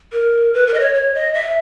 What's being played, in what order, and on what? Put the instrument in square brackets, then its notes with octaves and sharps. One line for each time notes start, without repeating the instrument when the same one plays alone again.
[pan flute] A#4
B4
A#4
D#5
C#5
C#5
D#5
E5